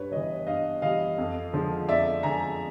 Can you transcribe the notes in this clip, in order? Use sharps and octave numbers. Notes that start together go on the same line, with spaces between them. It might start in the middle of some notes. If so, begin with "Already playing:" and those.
Already playing: G2 B4 C#5
E3 G3 C#5 D#5
G2 D#5 F5
E3 G3 D#5 F5
F2
D3 F3 G#3
F2 D5 E5
D3 F3 G#3 G#5 A#5